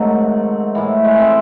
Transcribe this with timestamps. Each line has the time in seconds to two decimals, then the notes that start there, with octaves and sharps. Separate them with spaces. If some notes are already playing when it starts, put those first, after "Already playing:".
Already playing: G#2 D#3 F#3 A3 C4
0.75 A2 E3
1.04 G#3
1.19 C4